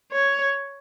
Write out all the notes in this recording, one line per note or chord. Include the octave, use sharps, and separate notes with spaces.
C#5